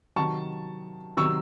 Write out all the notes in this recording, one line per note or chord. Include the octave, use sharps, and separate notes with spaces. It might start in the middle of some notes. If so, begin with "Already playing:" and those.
C3 D#3 F#3 A5 C#6
C3 D#3 F#3 C#6 E6